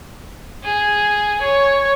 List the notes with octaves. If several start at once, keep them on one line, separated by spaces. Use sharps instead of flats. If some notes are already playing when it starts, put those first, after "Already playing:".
G#4
C#5